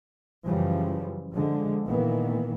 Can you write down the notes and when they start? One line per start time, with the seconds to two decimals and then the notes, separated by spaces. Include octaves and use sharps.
0.46 F#2 C#3 E3 F3 G3
1.31 D3 F3 G#3
1.87 A#2 D#3 E3 A#3 B3